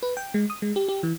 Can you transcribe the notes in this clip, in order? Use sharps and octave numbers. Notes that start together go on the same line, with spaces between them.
B4
G5
G#3
D#6
G#3
G4
G4
E3